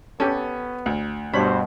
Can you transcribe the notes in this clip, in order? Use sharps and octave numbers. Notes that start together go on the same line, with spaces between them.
B3 C#4 G4 A4
D2
G2 B2 D4 C5 C#5 B5